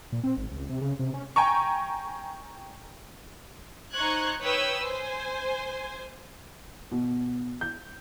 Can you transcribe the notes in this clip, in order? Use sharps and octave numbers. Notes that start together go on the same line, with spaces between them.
A#2
C4
G#1
C#2
C3
C#3
C3
C#4
G5 G#5 A#5 C#6
D#4 C5 C#6 F#6 G#6
B4 C#5 G5 D#6 E6
C5 G#5
B2
G6